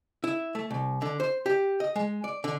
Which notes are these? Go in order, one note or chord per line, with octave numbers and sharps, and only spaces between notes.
E4
A3
C2
D3
C5
G4
D#5
G#3
D5
D3